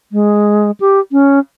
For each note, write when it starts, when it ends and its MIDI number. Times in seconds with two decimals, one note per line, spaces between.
0.12 0.71 56
0.80 1.00 67
1.12 1.39 61